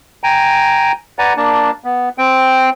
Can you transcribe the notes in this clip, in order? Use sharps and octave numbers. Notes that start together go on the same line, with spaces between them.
G5 G#5 A#5
B4 D5 F#5 G#5 A#5
A#3 D4 A5
B3
C4 G5